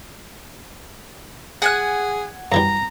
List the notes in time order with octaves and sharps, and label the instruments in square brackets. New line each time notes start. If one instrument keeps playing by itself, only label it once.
[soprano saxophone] G#4 [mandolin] F#5 G#5 F#6
[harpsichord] F#2 E3 G3 [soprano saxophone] A#5